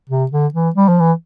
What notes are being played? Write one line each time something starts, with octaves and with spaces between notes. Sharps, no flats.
C3
D3
E3
G3
F3
E3